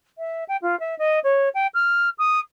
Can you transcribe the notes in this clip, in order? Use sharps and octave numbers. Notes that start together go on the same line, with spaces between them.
E5
G5
F4
E5
D#5
C#5
G5
F6
D#6